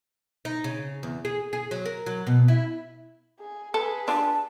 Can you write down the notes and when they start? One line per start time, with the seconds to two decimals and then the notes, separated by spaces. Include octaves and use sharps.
0.45 D#4
0.64 C#3
1.03 E2
1.25 G#4
1.53 G#4
1.71 F#3
1.86 A#4
2.06 F#3
2.27 B2
2.48 E4
3.40 G#4
3.74 G#4 A4 B4
4.08 D4 F4 G4 A5